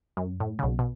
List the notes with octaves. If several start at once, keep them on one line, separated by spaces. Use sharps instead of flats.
F#2
A2
C#3
B1 B2
B2